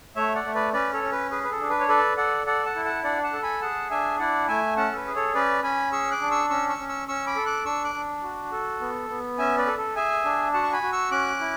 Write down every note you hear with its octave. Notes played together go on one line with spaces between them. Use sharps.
A3 C#5 E5
D5 F#5
A3
B4 D5
C#4 B4 D5
A4 C#5
C#4
B4
G#4 B4
B4
A4
D4
B4
C#5
A4 B4 D5
A4 D5 F#5
A4 D5 F#5
F#5 A5
E4
F#5 A5
D4 D5 F#5
F#5 A5
A4
G#5 B5
G#4 F#5 A5
D4 E5 G#5
E4 D5 F#5
A3 E5 G#5
C#4 F#5 A5
A4
B4
G#4
A4 C#5
C#4 B4 D5
C#4 G#5 B5
G#4 C#6 E6
D6 F#6
D4
C#6 E6
C#4 C#6 E6
C#6 E6
C#4
C#6 E6
C#4 C#6 E6
B5 D6
A4
D6 F#6
D4 C#6 E6
D6 F#6
D4
F#4
A4
B3
B3
C#4 E5 G#5
B4 D5
A4
A4
G#4 E5 G#5
D4
F#4 F#5 A5
C#6
G#5 B5
F#4
C#6 E6
C#4 D6 F#6
E4